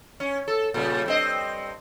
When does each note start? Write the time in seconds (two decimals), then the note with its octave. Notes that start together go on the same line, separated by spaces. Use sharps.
0.20 C#4
0.48 A4
0.74 A#2 C#3 G3
1.06 G2 C4 D#5